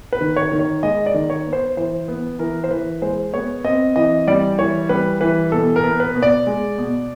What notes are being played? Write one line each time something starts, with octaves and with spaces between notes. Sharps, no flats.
B4
D#3
C#5
D#3
C#5
G#3 D#5
D5
D#3
C#5
B3
C5
E3 C5
B3
E3 A#4
C5
E3 B4
G#3 C5
B3 C#5
C4 D#5
E3 D#5
G3 D5
E3 C#5
G3 B4
E3 B4
B2 A4
A#4
B3
B4
B2
D5
G#3
B2